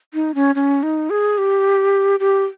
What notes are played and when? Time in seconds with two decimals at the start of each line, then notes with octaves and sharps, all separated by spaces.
0.14 D#4
0.35 C#4
0.55 C#4
0.83 D#4
1.10 G#4
1.38 G4
2.20 G4